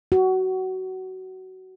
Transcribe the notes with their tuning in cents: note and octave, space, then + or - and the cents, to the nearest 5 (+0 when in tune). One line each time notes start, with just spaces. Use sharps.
F#4 +20